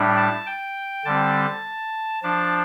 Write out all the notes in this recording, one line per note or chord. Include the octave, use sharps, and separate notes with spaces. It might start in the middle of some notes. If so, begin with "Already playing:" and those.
Already playing: A2 G3 D4
A5
G5
D3 G3 C4 A5
F3 D4 A5